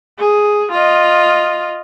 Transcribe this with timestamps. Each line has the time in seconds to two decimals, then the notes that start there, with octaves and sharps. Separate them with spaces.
0.19 G#4
0.72 F4 D#5